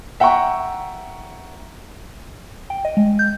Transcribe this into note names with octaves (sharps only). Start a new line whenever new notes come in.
E5 F#5 G5 A#5 C#6
G5
D#5
G#3
G6